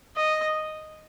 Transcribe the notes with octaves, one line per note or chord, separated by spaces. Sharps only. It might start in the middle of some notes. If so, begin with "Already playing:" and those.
D#5